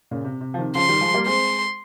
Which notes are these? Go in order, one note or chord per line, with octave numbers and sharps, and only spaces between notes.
A#2 C#3
C3
C3
F3
C3 D#3
C#3 F3 C6
D#3 G3
F3 G#3
G3 A#3
G#3 C4 C6